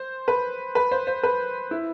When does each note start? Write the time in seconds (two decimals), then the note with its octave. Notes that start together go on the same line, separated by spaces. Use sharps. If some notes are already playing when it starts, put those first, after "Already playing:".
Already playing: C5
0.28 B4
0.75 B4
0.91 C5
1.07 C5
1.23 B4
1.71 E4